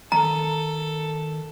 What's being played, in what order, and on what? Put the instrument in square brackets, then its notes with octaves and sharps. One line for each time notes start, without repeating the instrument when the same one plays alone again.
[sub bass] D#3 [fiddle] A4 [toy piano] A#5